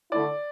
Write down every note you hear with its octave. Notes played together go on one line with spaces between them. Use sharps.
D3 A3 E4 D5